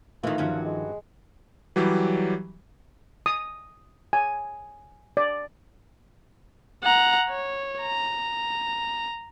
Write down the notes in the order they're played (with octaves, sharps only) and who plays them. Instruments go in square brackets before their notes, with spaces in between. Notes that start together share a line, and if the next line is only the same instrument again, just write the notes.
[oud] D#3 E3 [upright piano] A3 D#4 [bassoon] F4
[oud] G2 F#3 C#4 [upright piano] D#3 F3
[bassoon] G#3
[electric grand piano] E3 F#3 G3 G4
[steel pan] D#6
G#5
D5
[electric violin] F#5 A#5
C#5
A#5